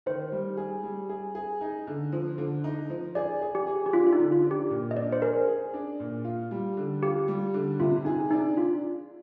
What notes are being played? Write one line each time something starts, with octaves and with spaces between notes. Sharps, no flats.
D#3 C5
G3
G#4
G3
G#4
G#4
D#4
D3
F3
D3
D#4
F3
G#4 D5
G#4
G4
G#4
G4
D4 F4
F4
D#4
D3
F4
D4
G4
A#2
D#5
D4 D5
C5
G#4 A#4
G#4
D4
A#2
F4
G3
D3
F4 G4
G3
D3
C3 F4
D#4 G#4
D4 D#4
D4 F4